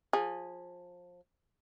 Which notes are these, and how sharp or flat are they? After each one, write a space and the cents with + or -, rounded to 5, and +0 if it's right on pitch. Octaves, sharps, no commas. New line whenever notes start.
F3 +25 G#4 -5